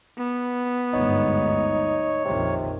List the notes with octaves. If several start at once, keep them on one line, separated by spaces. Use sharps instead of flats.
B3
G1 D2 G#2 D#4 C#5
A#1 F2 C3 D#3